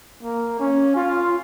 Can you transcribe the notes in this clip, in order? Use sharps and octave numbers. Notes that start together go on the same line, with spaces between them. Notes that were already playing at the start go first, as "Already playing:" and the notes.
A#3
C#4
F4